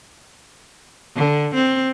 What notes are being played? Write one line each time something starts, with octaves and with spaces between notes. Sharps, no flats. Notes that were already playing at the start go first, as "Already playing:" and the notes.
D3
C4